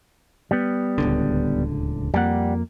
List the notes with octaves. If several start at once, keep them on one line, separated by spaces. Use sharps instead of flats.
G3 B3
D1 C#2 D3
F2 G3 A#3 F#5